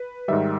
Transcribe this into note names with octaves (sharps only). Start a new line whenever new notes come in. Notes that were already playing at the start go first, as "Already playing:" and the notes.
Already playing: B4
G#2 D#3 G3 E5